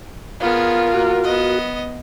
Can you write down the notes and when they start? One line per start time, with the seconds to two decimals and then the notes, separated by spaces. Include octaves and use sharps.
0.40 B3 F4 G#4 A#4
0.94 A#3 F#4
1.24 B3 D#5